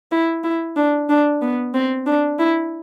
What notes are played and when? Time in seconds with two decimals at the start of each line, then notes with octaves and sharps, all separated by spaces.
0.12 E4
0.44 E4
0.77 D4
1.09 D4
1.42 B3
1.74 C4
2.06 D4
2.39 E4